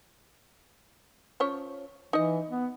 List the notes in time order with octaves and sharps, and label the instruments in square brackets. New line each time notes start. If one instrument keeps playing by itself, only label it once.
[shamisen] F3 C#4 C#5
[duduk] E3 [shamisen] D#4 D#5
[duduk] B3